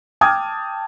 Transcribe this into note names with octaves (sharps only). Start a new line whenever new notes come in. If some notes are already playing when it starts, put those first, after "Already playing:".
G5 A5 D6 D#6 F6 G#6